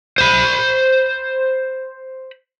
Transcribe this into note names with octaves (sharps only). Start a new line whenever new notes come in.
C5 B5